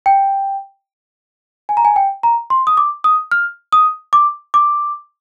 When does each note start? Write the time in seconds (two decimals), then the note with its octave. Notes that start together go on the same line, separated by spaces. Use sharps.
0.06 G5
1.69 G#5
1.77 A#5
1.85 G#5
1.96 G5
2.23 A#5
2.50 C6
2.67 D#6
2.77 D6
3.04 D#6
3.31 F6
3.72 D#6
4.13 D6
4.54 D6